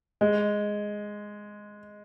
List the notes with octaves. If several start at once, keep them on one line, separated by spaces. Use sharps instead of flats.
G#3